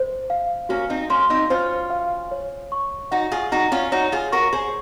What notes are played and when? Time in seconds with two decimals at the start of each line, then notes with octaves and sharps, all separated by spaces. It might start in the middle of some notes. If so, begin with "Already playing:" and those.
Already playing: C5
0.30 F5
0.69 A#3 C#4 F#4
0.90 C4 D#4
1.10 A#3 C#4 C6
1.30 C4 D#4
1.50 C#4 F4 C5
1.90 F5
2.31 C#5
2.72 C#6
3.11 D#4 F#4 F#5
3.32 F4 G#4
3.52 D#4 F#4 A#5
3.72 C#4 F4
3.92 D#4 F#4 C#5
4.12 F4 G#4
4.32 F#4 A#4 C#6
4.53 G#4 C5